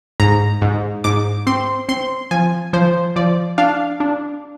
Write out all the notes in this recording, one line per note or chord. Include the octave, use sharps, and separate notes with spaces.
G#2 A#5
G#2
G#2 D6
C4 C6
C4 C6
F3 G#5
F3 C5
F3 D5
D4 F5
D4